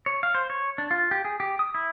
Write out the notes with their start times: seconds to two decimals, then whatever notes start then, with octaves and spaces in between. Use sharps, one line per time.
0.06 C#5
0.23 F5
0.35 C5
0.50 C#5
0.78 D4
0.91 F4
1.11 G4
1.25 G#4
1.40 G4
1.59 D#6
1.75 E4